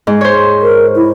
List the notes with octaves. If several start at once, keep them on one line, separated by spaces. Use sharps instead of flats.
G#2
C5 C#5
A#4
E4